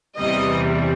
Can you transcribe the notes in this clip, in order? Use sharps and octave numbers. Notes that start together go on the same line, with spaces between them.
E2 C3 E3 G3 D#5